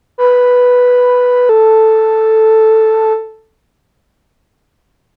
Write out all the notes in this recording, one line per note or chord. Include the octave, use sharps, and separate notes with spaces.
B4
A4